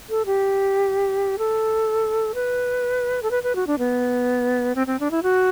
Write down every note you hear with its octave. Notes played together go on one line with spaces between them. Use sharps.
A4
G4
A4
B4
A4
B4
B4
F#4
D4
B3
C4
C4
D4
E4
F#4